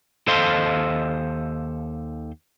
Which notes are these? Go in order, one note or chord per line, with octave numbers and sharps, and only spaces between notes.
D#2 A4 C5 D#5 F5 C6